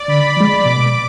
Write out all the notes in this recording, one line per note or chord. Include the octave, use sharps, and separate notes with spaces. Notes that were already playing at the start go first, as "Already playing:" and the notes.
Already playing: D5
D3 B5
F3 G#3
B2 D6